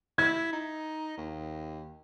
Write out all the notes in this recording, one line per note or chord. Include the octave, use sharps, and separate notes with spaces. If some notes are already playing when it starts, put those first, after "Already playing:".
E4 G#6
D#4
D#2